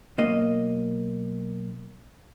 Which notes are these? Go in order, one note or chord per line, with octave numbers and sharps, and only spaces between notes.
B1 A#3 D#5